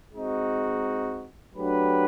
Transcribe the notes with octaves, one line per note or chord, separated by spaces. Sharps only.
G#3 C4 D#4 F#4
F#3 A3 D4 G4 B4